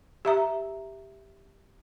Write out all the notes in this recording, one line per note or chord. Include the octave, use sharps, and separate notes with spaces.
G4 E5 A#5